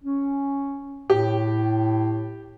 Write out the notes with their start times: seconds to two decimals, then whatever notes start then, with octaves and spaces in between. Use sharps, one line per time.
0.03 C#4
1.10 A2 G4